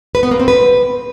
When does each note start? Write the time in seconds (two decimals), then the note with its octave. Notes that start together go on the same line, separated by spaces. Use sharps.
0.15 B4
0.23 B3
0.31 A#3
0.40 C4
0.48 B4